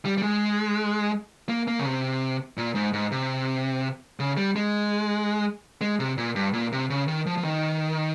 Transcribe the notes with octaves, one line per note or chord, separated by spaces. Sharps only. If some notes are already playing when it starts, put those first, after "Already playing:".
G3
G3
G#3
A#3
A#3
C#3
C3
A#2
G#2
G#2
C3
C#3
G3
G#3
G#3
C3
A#2
G2
A#2
C3
C#3
D#3
F3
F3
D#3